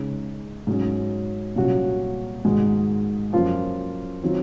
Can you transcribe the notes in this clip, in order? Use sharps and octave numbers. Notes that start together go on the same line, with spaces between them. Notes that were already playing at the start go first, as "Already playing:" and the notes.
Already playing: C#3 G#3 D#4
G#2 F#3 C#4
C2 A#2 F#3 C#4 F#4
G#2 D#3 G#3 D#4 F#4
F#2 F3 A#3 F4
D#3 F#3 C4 F4